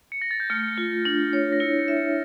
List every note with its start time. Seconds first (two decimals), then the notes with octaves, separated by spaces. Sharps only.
0.12 C#7
0.22 A#6
0.31 A6
0.40 G6
0.50 A3 F6
0.78 F4
1.05 D4
1.33 C#5
1.52 A#6
1.60 E4 C#7
1.79 C#7
1.88 E5
1.97 C#7